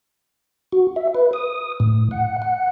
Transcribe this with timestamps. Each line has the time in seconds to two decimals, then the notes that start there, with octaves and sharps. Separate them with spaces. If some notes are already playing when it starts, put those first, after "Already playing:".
0.72 F#4
0.96 E5
1.15 B4
1.33 D#6
1.80 A2
2.11 F#5
2.42 F#5